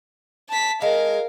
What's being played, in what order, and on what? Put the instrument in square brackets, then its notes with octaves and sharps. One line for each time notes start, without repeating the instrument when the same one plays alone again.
[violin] A5 B6
[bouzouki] G#3 [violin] A#4 F5